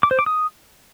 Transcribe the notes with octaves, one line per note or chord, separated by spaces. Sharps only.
D6
C5
D6
D#6